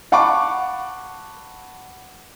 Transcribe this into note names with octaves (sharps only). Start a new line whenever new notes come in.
F5 F#5 A5 B5 C#6 D6